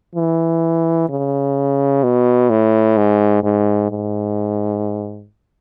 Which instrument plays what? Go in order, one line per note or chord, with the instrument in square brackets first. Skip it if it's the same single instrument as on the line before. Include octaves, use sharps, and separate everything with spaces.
[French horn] E3
C#3
B2
A2
G#2
G#2
G#2